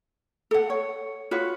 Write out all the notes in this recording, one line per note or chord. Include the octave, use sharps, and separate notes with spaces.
A4 F#5
C#5
F4 F#4 B4 C#5